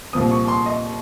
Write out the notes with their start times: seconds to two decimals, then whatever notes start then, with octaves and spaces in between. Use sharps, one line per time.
0.13 C2 A#2 F3 C4 D#6
0.31 C#6
0.48 C6
0.66 D#5